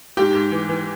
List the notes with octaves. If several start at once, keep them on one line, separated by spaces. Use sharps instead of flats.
G#2 G4
G#2
E3
E3